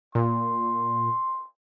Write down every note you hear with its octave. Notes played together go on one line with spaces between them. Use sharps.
A#2 C6